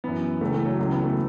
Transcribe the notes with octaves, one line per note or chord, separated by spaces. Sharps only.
F#2 E3 B3
C#2 C#3 E3 A3
A3
F#3
C#2 C#3 E3 F#3
B3
A3